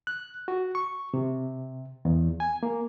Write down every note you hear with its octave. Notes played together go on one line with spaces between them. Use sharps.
F#6
F#4
C#6
C3
E2
G#5
A#3